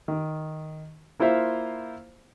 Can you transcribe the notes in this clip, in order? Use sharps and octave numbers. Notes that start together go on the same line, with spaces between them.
D#3
A#3 E4 F4 C5 E5 F5